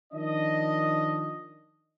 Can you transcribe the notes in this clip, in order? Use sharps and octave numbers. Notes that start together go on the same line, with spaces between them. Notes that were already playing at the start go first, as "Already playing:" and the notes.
D#3 F3 D4 D#5